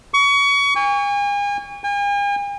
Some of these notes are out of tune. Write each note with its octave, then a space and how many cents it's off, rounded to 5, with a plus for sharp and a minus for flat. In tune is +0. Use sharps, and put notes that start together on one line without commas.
C#6 +30
G#5 -40
G#5 -45